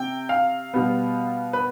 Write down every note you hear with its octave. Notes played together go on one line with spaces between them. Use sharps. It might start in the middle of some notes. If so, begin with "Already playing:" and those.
Already playing: C3 G5
F5
B2 G3 B3
B4